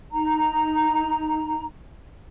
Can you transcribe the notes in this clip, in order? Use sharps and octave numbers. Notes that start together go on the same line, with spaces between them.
D#4 A#5